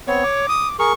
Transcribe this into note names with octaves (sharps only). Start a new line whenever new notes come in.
B3 C4 C#5
D6
D#6
G#4 A#4 C#6